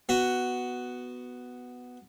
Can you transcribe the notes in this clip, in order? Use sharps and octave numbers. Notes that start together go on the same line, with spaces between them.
B3 F#4